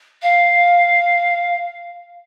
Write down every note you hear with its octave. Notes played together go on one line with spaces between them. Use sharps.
F5